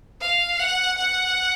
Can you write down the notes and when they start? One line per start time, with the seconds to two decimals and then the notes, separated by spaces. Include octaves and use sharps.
0.21 F5
0.59 F#5
0.98 F#5